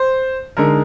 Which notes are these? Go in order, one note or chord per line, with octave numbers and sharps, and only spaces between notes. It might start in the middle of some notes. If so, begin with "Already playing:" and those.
Already playing: C5
D3 G#3 D#4 A#4